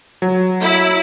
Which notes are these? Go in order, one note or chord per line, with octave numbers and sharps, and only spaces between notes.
F#3
E4